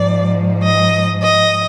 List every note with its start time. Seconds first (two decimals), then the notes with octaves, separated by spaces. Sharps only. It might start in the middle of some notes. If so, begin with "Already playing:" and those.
Already playing: G#2 F3 D5
0.63 D#5
1.22 D#5